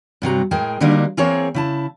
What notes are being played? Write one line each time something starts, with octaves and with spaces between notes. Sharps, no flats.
G2 C3 F#3 A#5
A2 G#3 G#4 A#4 G5
D3 F#3 G3 A#3 D4 D#4
E3 A#3 C4 G#4 A#4 C#5
C#3 E4 A5